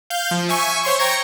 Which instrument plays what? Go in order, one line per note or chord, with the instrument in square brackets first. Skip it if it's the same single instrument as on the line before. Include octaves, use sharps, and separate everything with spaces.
[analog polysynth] F5 G6
F3
E5 G#5 C#6
C5 C#5 C6 C#6
G5 A#5 C#6 G#6 A#6 C#7